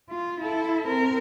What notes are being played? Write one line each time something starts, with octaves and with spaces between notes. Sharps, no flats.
F4
E4 A4
C4 A#4